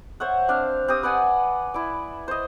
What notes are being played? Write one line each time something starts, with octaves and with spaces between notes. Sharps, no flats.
C5 C#5 E5 F#5
C4 D4 F5
C4 G4 D#6
B4 D5 F#5 G#5
E4 D5
C5 D#5